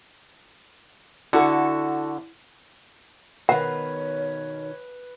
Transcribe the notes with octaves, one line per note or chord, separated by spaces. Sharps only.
D3 E4 F#4 A4
B2 D#3 B4 C#5 F#5